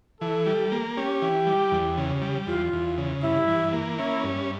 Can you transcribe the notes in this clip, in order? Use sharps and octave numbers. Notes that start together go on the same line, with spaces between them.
E3 A4
G3
A#3
C#4 G4
E3
G3
E2
C#3
G3
E2 F4
E2
C#3
G2 E4
E3
A#3
C#4 E4
G2